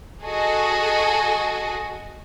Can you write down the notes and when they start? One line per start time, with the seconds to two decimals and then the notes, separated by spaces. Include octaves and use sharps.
0.24 F#4 G#4 A4 D#5